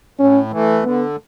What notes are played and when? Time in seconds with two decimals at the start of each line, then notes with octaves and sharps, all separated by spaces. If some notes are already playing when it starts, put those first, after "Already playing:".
0.19 A2 C#4
0.52 E3 A3
0.84 D3 B3